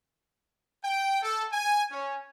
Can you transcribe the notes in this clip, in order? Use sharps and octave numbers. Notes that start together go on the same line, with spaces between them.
G5
A4
G#5
C#4